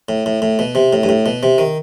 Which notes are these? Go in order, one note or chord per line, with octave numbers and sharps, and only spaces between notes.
A2
A2
A2
B2
C3
A2
G2
A2
B2
C3
D#3